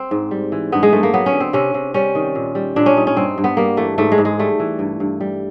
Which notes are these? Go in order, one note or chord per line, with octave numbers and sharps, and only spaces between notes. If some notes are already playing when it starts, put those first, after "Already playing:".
Already playing: C4
G#2
G3
E3
G2 B3
G#3
G2 A3
A#3
F#3 B3
C#4
D3
C4
C3 C#4
C3
G3 C#4
D#3
A#2
G3
A#2 D4
C#4
G3 D#4
C#4
G2 C4
G2
B3
G3 A#3
E3 A3
G#2 A3
G#3
G#2
G#3
G3 A3
E3
G2
G2
G3